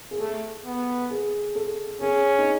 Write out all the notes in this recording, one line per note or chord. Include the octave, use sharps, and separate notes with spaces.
G#4
A3 A4
B3
G#4
A4
C#4 G#4
D#4